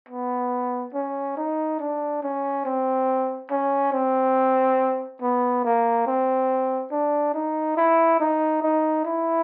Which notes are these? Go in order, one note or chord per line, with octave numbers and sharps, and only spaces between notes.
B3
C#4
D#4
D4
C#4
C4
C#4
C4
B3
A#3
C4
D4
D#4
E4
D#4
D#4
E4